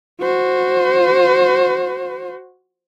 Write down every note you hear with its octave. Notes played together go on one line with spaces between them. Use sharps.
F#4 C5